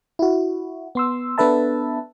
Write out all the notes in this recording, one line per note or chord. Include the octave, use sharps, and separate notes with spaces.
E4 F#4
B3 C6 E6
B3 D4 A4 B4 E5 A5